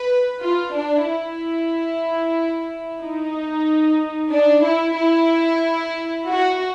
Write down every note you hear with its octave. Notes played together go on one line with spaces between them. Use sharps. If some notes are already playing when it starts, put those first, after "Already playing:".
Already playing: B4
F4
D4
E4
D#4
D4
E4
E4
F#4